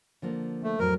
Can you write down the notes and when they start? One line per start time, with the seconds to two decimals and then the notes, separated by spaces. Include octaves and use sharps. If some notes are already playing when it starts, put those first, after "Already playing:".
0.22 D3 F3 A#3
0.63 A3
0.79 F2 A2 F#3 A#4